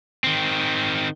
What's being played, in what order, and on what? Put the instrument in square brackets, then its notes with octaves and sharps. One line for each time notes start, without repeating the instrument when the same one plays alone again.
[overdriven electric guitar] D#3 C4